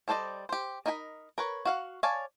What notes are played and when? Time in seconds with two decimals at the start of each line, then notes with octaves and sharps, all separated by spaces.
0.08 G3 A4 C5 D5 D#5
0.49 G4 C5
0.86 D#4 A#4 D#5 G5 B5
1.38 A#4 B4 C#5
1.65 F#4 F5 F#5
2.03 C#5 D5 F5 G#5 A5